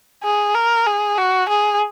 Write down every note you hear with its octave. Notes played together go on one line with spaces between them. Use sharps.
G#4
A#4
G#4
F#4
G#4